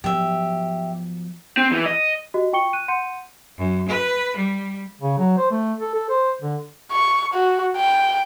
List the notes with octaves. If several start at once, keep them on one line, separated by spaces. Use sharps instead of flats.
F3 F#3 B3 G4 E5
C4
E3
D#5
F#4 G4 D#5
F4 G5 C#6 C#7 G7
F#6 D#7
F#5 C6 G6 C#7 D#7
F#2
B4
G3
C#3
F#3
C5
A3
A4
A4
C5
D3
C#6
F#4
G5